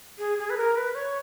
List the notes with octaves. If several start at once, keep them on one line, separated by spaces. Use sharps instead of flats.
G#4
G#4
B4
A#4
B4
C#5